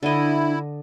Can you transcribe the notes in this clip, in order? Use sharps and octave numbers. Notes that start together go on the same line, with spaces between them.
D3 D4 E4 D#5